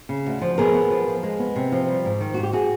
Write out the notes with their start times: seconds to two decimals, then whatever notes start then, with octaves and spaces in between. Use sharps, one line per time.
0.09 C#3
0.26 D2
0.41 F3
0.58 B3 G#4 A#4
0.74 B3
0.90 F3
1.08 F3
1.23 G#3
1.39 B3
1.56 C3
1.72 F3
1.88 G3
2.05 G#2
2.20 D#3
2.34 G#2 F#4
2.43 G4
2.53 F#4 G#4